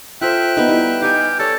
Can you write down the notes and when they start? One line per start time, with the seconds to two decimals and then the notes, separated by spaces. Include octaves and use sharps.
0.21 F4 A4 C5 E5 G5 F#6
0.57 B3 D#4
0.69 G3 E4
1.02 D#4 G4 F5 G#5
1.40 A4 C#5 D5